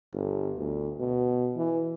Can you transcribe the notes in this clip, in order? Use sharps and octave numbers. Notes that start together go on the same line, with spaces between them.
G1
D2
B2
E3